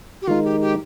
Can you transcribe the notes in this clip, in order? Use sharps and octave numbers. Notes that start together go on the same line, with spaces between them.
G4
D#3 G#3 D#4 F4
G4
G4